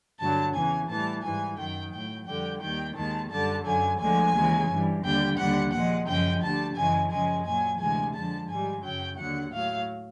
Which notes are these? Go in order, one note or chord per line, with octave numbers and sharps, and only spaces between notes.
G2 D3 F#3 A5
E2 C#3 E3 G#5
A2 E3 G3 A5
G#2 E3 G3 G#5
F#2 D#3 F#3 G5
A2 F#3 G5
F2 D3 G3 G5
D#2 D#3 G3 G5
D#2 D#3 G#3 A5
F#2 D3 G3 A5
F#2 D3 F#3 G#5
D2 D3 F3 G#3 G#5
D#2 C#3 E3 G#3
G2 E3 G3
D#2 D3 G3 G5
D#2 D3 G3 F#5
A#2 F3 G#3 F#5
F#2 C#3 F3 G#3 G5
D2 D3 G3 A5
F#2 C#3 E3 G#3 G#5
F#2 C#3 F3 G#3 G#5
A#2 F#3 G#5
D2 C3 E3 G#3 G#5
F2 D3 F3 G#3 A5
G#2 D#3 G3 G#5
F#2 C#3 F#3 G5
D#2 D3 F#3 F#5
A2 F#3 F5